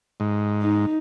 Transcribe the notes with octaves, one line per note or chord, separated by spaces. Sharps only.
G#2
D#4